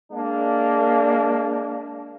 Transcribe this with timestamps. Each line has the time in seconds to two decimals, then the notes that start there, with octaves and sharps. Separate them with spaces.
0.12 G#3 A#3 D4